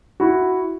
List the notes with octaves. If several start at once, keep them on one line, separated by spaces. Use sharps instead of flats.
E4 F#4